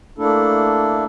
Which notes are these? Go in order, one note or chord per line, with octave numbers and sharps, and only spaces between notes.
A3 A#3 D4 E4 A4